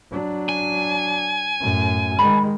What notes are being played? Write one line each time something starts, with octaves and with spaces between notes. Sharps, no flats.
F#3 D4
G#5
F#2 A2
D#3 G#3 B5